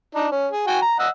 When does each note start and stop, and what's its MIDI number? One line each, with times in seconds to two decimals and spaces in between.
0.15 0.27 62
0.15 0.27 63
0.31 0.48 61
0.52 0.67 68
0.67 0.80 66
0.67 0.80 79
0.67 0.80 80
0.82 0.96 82
0.99 1.09 75
0.99 1.09 78
0.99 1.09 88